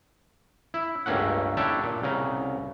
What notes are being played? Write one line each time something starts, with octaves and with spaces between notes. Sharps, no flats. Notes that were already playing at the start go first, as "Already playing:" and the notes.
E4
C#2 G2 A3 A#3 C#4 F#5
D4 E4 G4 A4 C#5 D5
A#2
C2 C#3 A#5